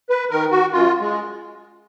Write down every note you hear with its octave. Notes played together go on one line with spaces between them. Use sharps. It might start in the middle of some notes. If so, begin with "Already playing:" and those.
B4
D#3 A#4
F#4
F#2 F4
G#3